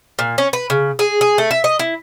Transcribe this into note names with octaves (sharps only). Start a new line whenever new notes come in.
A#2
C#4
B4
C#3
G#4
G#4
A3
E5
D#5
E4